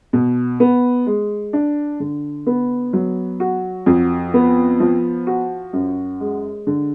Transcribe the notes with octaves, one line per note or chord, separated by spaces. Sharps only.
B2
B3
G#3
D4
D3
B3
F#3
F#4
F2
B3
F3
F#4
F#2
G#3
D3